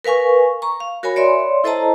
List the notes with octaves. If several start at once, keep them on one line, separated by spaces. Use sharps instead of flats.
A#4 B4 F5 G#5 C#6
A#5 C#6
F5
F#4 A#4 C#5 G#5 B5
C#5 D5 E5 C6
E4 A4 C5 D#5 A5 A#5